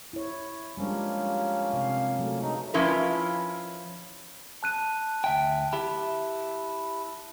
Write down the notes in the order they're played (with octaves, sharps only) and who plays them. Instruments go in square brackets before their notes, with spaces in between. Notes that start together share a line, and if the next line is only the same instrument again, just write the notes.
[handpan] E4 C#5
[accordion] F3 A#3 C#4 [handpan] G3 G#3 D4
[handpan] C3 F5
F#3 A3
[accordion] G2 C#3 D#4
[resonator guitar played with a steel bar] F3 C#4 E4 F4 A#4 B4
[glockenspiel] A5 F#6 D#7
[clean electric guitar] D2 E5 G5
E4 G4 E5